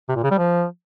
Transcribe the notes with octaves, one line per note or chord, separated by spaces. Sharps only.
C3
A#2
C#3
G3
F3